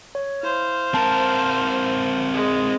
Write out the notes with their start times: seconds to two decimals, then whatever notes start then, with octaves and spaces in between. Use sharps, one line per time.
0.15 C#5
0.43 E4 C5 F5
0.94 C4 A#4 A5
2.33 G#3